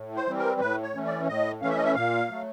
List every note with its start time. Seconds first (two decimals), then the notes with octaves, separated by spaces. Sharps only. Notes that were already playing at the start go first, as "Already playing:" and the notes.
Already playing: A2
0.16 C5
0.26 E3 G3 C4
0.38 A#4
0.60 A2 B4
0.83 C#5
0.94 E3 A3 C#4
1.05 D5
1.28 A2 D#5
1.61 E3 A3 C#4 F5
1.70 E5
1.76 D#5
1.84 E5
1.95 A#2 F5
2.29 F#3 A3